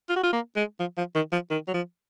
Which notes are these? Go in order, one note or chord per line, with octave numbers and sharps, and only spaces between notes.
F4
F#4
F4
A#3
G#3
F3
F3
D#3
F3
D#3
F#3
F3